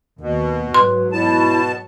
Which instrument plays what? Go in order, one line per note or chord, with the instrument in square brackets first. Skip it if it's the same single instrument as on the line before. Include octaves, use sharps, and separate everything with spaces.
[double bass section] D#2 [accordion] B2
[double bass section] G#2 F#3 [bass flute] B4 [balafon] C6
[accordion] B2 A5 [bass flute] E4